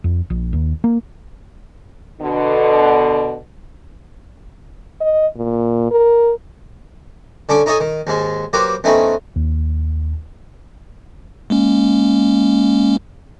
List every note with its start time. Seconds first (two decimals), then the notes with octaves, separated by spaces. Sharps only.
0.04 F2
0.30 A#1
0.53 D#2
0.84 A#3
2.21 B2 D3
5.01 D#5
5.37 A#2
5.91 A#4
7.49 D3 C#4 A4 C#6 D6
7.66 D#4 A4 C#5 D#5 G#5 D#6
7.80 D#3
8.07 D#2 G#2 G#3
8.53 F#3 A#3 F#4 G4 B4 C5
8.84 E2 A3 C4 C#4 D#4 B5
9.36 D#2
11.50 G#3 A#3 C#4